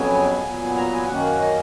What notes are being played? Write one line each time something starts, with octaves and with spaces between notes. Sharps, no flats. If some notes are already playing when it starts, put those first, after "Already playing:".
Already playing: F2 C#3 F#3 B3 G#5
A#2 F#3 B3
A#5
G#5
F#2 D#3 A#3 C#4 F#5
D#5